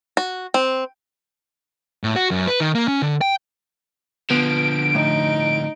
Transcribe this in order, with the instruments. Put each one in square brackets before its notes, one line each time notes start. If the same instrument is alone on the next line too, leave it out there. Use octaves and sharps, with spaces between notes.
[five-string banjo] F#4
C4
[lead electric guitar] A2
F#4
F#2
B4
D#3
A#3
C#4
D3
G5
[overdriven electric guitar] D3 F3 [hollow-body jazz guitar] B3 [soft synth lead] D7
[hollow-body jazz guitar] A2 [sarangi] D#4